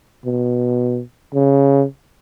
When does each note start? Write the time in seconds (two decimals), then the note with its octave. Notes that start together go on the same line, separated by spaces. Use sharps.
0.25 B2
1.34 C#3